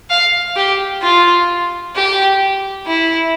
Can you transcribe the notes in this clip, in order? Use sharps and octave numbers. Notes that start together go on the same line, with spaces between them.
F5
G4
F4
G4
E4